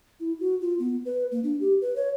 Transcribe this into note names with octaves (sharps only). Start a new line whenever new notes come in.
E4
F#4
F4
B3
B4
A#3
D4
G4
B4
C#5